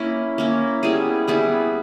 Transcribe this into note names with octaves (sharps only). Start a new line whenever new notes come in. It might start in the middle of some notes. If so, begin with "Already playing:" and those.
Already playing: A#3 C#4 E4
A#3 C#4 E4
G3 B3 E4 G#4
G3 B3 E4 G#4